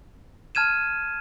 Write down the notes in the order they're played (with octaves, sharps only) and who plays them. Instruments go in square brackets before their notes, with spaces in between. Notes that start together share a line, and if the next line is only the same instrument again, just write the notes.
[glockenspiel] A5 F6 G#6 D#7 E7